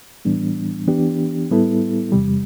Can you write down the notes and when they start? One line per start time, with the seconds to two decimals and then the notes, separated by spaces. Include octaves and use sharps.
0.25 A2 E3 G3 B3 D4
0.88 E3 B3 D4 G4
1.50 A2 G3 B3 E4 A4
2.12 E2 C3 G3